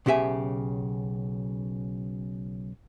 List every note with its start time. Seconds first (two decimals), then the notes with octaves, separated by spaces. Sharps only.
0.06 B1 C#3 G4 E5 G#5